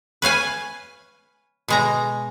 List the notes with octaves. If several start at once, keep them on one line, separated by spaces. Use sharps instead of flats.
B4 C#5 F5 G#5
B2 G#3 A#5